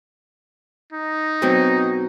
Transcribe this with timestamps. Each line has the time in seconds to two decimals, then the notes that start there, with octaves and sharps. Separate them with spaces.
0.92 D#4
1.42 B2 F#3 C4